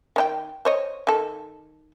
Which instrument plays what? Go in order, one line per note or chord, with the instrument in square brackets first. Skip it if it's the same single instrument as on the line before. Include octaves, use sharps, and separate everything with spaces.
[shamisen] D#3 D4 G5
C5 C#5 D#5
D#3 A4